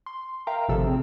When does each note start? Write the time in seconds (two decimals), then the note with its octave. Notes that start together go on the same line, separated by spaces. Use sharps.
0.06 C6
0.47 A#4 E5 F5 G5 A#5
0.69 G#1 C3 F3 A3 A4 E6
0.86 C4 G#4